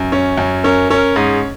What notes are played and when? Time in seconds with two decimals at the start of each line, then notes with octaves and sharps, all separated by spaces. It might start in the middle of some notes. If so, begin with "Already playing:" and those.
Already playing: F#2
0.12 C#4
0.37 F#2
0.64 C#4 A#4
0.90 C#4 A#4
1.16 G#2 G#4